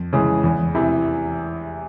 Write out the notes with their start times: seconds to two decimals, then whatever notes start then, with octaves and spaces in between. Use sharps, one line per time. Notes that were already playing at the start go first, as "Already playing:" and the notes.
Already playing: F2
0.13 C#3 E3 G#3
0.44 E2
0.75 C3 E3